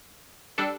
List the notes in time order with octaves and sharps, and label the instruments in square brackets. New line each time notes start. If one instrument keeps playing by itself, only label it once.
[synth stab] G3 D4 A4